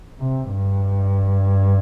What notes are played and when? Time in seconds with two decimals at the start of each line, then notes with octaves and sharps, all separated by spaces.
0.20 C3
0.49 G2